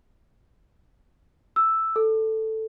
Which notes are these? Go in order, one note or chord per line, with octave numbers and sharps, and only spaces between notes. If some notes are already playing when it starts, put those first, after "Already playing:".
E6
A4